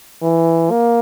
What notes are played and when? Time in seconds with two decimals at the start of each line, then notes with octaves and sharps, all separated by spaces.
0.23 E3
0.71 A#3